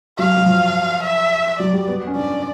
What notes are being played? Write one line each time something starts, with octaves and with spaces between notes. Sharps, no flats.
F#3 F5
F#3
F3
E5
F#3 D5
G3
B3
C#4
D4 D5